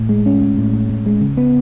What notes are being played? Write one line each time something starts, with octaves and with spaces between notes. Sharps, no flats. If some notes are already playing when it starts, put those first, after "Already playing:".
Already playing: A2
G#3
C#4
A2
A2
A2
A2
G#3
C#3
B3